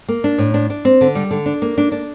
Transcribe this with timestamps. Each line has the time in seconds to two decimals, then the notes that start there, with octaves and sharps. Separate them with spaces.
0.09 A#3
0.24 D4
0.38 A2
0.54 D4
0.70 D4
0.85 C4
1.01 D3
1.15 G3
1.31 D3
1.46 D4
1.62 A#3
1.78 D4
1.92 D4